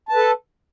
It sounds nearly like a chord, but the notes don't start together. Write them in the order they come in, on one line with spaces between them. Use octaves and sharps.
A5 B4 A4